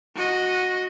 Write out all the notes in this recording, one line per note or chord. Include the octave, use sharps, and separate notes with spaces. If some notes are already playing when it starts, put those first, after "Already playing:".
F#4 D#5